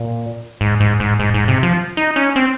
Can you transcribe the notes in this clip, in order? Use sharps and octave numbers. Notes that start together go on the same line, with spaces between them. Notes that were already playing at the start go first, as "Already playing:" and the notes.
Already playing: A#2
G#2
G#2
G#2
G#2
G#2
C3
F3
D#4
C#4
C4